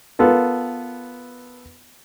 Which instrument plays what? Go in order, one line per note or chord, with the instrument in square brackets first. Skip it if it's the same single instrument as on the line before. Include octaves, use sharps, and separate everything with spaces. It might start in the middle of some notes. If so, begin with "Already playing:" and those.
[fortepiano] B3 F4 A4 A#4